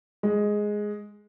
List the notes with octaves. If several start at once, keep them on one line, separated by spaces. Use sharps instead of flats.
G#3